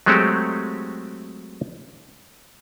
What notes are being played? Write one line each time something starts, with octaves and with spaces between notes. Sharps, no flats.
F#3 G#3 A3 C4 F#4 G4